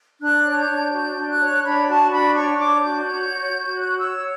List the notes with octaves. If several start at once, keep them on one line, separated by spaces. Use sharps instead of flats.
D4 F#6
C#5
G6
D4
F#4 G6
D4
F#6
C#5
D4 B5
F#4 A5
D4 B5
C#5 C#6
D4 D6
F#4 G6
C#5
F#4
F#4
C#5 F#6
C#5 E6